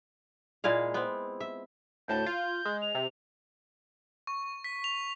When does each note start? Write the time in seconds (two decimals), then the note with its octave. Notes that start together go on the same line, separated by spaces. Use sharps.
0.64 A#2 G#3 E4 F5
0.94 B3 C4
1.41 E5
2.08 D2 A2 A5 G6
2.26 F4
2.65 G#3
2.82 F7
2.95 C3
4.27 C#6
4.64 B6
4.84 F7